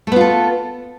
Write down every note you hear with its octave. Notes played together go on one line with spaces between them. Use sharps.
A3 B3 F4 A4